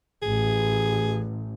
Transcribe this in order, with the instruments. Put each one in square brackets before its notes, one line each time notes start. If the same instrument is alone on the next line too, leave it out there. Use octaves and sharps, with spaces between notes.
[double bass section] A1 [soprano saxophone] G#4